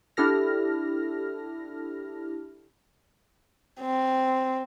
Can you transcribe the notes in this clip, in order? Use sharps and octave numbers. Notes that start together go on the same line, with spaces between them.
D4 E4 G4 A4 F6 A#6
C4